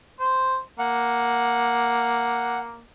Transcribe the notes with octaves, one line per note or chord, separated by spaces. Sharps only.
C5
A#3 F#5